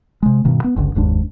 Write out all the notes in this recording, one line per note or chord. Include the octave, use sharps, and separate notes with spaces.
C3 G#3
G2 B2 D#3
B3
G1 C#2 D3
F#1 D#2 G#2 D4